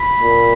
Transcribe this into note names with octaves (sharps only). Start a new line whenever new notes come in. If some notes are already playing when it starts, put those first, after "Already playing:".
Already playing: B5
A#2